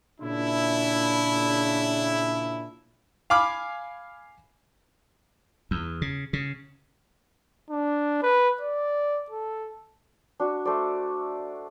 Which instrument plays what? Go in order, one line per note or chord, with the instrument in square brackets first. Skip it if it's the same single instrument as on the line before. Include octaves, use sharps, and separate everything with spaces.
[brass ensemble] A#2 C#3 D4 E4
[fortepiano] F5 G#5 B5 D6 F6
[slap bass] E2
C#3
C#3
[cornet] D4
B4
D5
A4
[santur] D4 F#4
A3 C5 D5